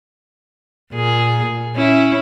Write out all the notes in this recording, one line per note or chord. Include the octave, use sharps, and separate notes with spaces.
A#2 G#4
C#4 E4